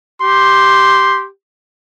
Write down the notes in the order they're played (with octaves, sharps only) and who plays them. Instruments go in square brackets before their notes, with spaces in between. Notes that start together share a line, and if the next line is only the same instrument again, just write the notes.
[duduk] G4 [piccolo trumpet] C6